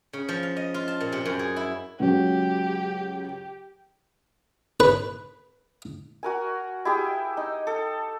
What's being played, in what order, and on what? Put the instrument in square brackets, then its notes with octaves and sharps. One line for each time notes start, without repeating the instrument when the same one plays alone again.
[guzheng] C#3
F3
F5
D#5
F4
A5
A#2
C3
F#2
G#4
E4
[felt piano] C#2 F#3 [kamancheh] G4
[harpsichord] B4
[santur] F#4 A#4 G#5
E4 G4 G#4 G5
D#4
A4